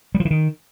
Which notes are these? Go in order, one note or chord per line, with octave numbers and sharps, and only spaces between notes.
G3
F3
E3
D#3